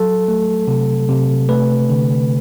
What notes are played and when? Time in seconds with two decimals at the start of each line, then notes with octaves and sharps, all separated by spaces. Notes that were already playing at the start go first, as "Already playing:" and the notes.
Already playing: F#3 A4
0.28 A3
0.68 C3
1.09 C3
1.49 A3 B4
1.90 D3